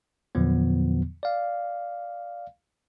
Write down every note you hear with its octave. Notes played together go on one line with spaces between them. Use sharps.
E2 A#2 D3 F3 F#3 B3
D5 F5